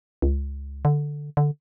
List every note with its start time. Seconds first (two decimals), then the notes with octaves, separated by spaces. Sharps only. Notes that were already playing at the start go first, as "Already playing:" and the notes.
0.22 C#2
0.85 D3
1.37 D3